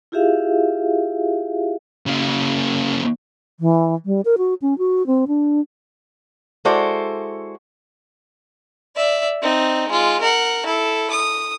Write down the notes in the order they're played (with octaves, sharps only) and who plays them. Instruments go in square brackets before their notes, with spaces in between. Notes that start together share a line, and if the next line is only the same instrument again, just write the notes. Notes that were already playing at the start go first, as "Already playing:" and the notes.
[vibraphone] E4 F4 G4 G#4 E5 F5
[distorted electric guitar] C#3 A#3
[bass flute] E3
G3
A#4
F#4
C#4
F#4
C4
D4
[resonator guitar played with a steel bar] G#3 E4 F#4 A4 C5 D5
[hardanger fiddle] D5 E5
C4 D#4
G#3 F4
A#4 F#5
E4 A4
D#6